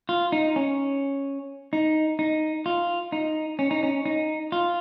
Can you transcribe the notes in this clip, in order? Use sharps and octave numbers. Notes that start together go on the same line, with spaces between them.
F4
D#4
C#4
D#4
D#4
F4
D#4
C#4
D#4
C#4
D#4
F4